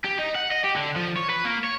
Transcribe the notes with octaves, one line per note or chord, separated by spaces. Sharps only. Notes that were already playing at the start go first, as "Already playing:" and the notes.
G4
D#4
F#5
D#5
G4
D3
F3
C#5
B4
A#3
C#5